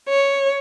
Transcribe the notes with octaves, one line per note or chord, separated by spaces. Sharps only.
C#5